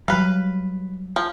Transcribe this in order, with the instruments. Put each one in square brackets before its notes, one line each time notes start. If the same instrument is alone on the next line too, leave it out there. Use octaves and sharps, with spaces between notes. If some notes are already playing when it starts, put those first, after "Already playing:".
[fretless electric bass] F#3 G3 [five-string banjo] B4 F5
[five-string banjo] F3